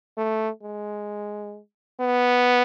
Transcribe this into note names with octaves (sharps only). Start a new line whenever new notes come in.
A3
G#3
B3